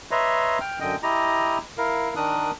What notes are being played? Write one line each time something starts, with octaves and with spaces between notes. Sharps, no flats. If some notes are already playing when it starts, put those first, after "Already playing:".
B4 C#5 D#5 E5 A#5 C6
G5 F6
F#2 D3 D#5 G5
E4 G4 D#5 A#5
E4 A#4 F5
D#3 D4 A#4 D#6 F#6